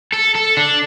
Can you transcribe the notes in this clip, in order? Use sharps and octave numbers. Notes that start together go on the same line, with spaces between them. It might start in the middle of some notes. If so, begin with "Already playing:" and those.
A4
A4
D4